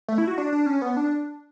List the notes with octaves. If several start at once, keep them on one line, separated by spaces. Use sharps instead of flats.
A3
E4
F#4
D4
D4
C#4
B3
D4